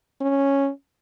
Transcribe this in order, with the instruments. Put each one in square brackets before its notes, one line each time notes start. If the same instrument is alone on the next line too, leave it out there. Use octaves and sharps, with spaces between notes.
[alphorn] C#4